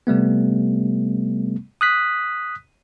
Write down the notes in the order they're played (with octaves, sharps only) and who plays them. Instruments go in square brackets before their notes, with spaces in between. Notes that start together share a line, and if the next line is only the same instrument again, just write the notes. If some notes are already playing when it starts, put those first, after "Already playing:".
[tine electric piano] C3 G3 A3 B3
D#6 F#6 B6